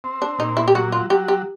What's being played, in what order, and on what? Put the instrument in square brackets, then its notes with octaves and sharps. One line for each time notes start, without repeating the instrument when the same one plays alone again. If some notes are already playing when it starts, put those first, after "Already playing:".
[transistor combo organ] C4
[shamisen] D4
[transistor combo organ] A#2 [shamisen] D#4
[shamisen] E4
G4
[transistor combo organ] F#3 [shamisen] F#4
[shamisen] F4
[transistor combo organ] F#3 [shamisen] G4
[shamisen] G4